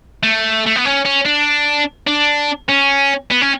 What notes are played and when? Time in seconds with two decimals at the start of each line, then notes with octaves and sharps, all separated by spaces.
0.23 A3
0.66 A3
0.76 B3
0.85 C#4
1.05 C#4
1.25 D4
2.07 D4
2.69 C#4
3.30 B3
3.41 C#4